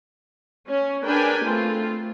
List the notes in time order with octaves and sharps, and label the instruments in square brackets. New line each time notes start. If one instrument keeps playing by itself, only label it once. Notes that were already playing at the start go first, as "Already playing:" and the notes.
[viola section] C#4
D4 G#4 A#4 B4 G5 G#5
A3 C4 F4